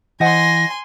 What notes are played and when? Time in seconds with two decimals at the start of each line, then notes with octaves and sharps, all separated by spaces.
0.20 E3 C5 D#5 F#5 G#5 C6 A#6